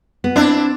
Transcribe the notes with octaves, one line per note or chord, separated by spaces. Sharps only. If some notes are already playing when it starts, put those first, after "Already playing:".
B3
C4 D4 E4